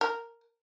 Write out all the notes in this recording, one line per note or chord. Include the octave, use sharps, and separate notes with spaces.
A#4